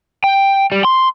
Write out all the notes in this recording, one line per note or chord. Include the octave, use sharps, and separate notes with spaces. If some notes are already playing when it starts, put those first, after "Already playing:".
G5
G3
C6